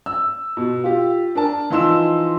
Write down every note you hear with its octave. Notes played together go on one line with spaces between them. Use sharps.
E6
B2
F4 G4
D4 A#4 A5
E3 F3 D#4 C6 E6 E7